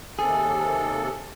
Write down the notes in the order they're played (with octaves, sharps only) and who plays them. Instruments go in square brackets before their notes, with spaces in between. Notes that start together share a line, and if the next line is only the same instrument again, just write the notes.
[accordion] D#2 C3 A4 [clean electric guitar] G#4